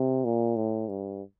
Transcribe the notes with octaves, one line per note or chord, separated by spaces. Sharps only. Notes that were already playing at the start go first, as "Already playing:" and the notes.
Already playing: C3
A#2
A2
G2